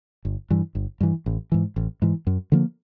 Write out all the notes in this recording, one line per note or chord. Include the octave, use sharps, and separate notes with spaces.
G1
G2 E3
G1
G2 E3
A1
G#2 E3
A1
G#2 E3
F#2
D3 F3 A#3